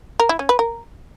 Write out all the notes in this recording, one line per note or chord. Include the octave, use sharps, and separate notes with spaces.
A#4
E4
C#4
B4
A#4